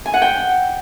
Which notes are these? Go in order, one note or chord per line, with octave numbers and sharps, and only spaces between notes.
G#5
F#5
G5